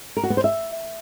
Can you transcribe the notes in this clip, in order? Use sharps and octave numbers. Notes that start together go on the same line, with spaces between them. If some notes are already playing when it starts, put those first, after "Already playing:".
A#4
F#4
B3
C5
E5